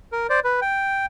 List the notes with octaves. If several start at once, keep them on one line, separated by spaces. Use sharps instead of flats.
A#4
C5 D5
B4
G5